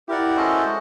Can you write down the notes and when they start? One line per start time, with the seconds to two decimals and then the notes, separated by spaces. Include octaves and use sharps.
0.08 E4 G4 A#4 D5 F#5
0.36 C#4 F#4 A4 C5 D#5
0.65 G#3